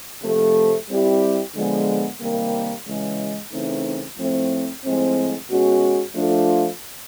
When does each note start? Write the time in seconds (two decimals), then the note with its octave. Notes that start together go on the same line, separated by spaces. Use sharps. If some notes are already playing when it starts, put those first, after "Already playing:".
0.23 C3 F3 A3
0.89 G3 C4 E4 G4
1.54 D3 F3 G#3 B3
2.20 C3 D#3 G3 A#3
2.86 C#3 E3 G#3
3.52 C#3 E3 A3 C4 D#4
4.18 A2 F3 A3 C4
4.84 A2 F3 G#3 C4
5.50 B2 G#3 C#4 F#4
6.15 F3 A3 D4 F4 A4